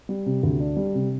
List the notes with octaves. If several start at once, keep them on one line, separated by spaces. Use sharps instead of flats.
G3
C3
D2
D4
G3
C3